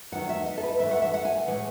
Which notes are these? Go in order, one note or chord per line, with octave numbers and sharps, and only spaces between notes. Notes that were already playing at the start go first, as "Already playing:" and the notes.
E2 D#3 F#3 A3 F#5
E5
D#5
A4
B4
G#2 E3 A3 E5
F#5
E5
F#5
G#5
G#5
A2 E3 G#3 F#5